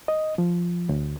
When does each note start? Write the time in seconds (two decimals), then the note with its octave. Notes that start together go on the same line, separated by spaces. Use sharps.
0.08 D#5
0.38 F3
0.89 D2